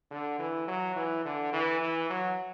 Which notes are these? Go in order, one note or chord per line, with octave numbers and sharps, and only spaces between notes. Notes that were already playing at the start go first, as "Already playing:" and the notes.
D3
E3
F#3
E3
D3
E3
E3
F#3